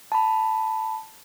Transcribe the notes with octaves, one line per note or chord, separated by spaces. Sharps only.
A5 B5